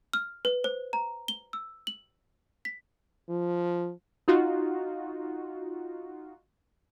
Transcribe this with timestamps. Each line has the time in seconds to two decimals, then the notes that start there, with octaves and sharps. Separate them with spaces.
0.14 F6
0.45 B4
0.64 C5
0.93 A#5
1.28 G7
1.53 E6
1.87 F#7
2.65 B6
3.30 F3
4.28 D#4 F4 F#4